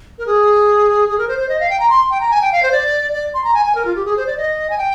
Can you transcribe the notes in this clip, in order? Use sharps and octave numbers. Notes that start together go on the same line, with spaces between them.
A#4
G#4
G#4
A#4
C5
C5
D#5
F5
G5
A#5
C6
G5
A#5
G#5
G5
F5
C5
D5
D5
C6
A#5
G#5
G#5
A#4
F4
G4
G#4
C5
D5
D#5
G#5
G5